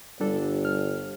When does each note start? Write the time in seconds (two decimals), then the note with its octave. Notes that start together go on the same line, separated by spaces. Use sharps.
0.20 G1 G3 D4 A4
0.65 F6